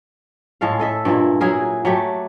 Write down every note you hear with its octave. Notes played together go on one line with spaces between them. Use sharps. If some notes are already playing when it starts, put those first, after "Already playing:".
A2 G#3 A4 F5
A4 D#5 E5
G2 A#2 G#3 E4
F#3 E4 G#4 A#4
F#3 A3 G4